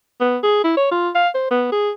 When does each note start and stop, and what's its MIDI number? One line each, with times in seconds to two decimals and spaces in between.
0.20 0.38 59
0.43 0.60 68
0.64 0.76 64
0.77 0.86 73
0.91 1.09 65
1.15 1.28 77
1.34 1.46 72
1.51 1.68 59
1.72 1.91 68